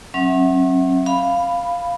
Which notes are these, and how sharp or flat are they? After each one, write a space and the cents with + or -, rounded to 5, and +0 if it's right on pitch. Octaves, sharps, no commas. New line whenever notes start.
F#3 +5 C#4 -45 E5 -15
F5 +0 B5 +0